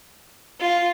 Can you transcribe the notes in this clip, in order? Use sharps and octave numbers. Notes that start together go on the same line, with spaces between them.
F4